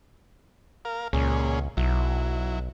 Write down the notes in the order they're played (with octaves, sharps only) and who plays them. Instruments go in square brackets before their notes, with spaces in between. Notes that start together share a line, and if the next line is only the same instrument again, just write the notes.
[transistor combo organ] A#4 F5
[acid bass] C#2 [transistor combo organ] A#2 C#4 G#4
[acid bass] B1 [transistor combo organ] F#3 E4